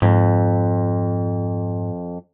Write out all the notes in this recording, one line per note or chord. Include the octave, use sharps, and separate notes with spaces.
F2 G#2